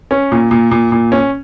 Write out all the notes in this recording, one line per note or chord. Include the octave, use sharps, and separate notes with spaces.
C#4
A#2
A#2
A#2
A#2
C#4